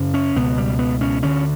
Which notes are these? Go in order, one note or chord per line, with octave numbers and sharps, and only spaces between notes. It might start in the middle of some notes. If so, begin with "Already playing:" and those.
Already playing: F#2 C#3
C#4
C#2 B2 B3
G3
B3
C#4
D2 D3 C#4